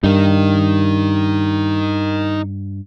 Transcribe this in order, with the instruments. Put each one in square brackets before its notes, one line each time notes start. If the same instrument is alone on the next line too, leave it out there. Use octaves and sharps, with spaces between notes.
[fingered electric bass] G2 [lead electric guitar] D#4 A#4